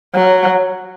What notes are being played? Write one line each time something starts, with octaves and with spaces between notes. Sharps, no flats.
F#3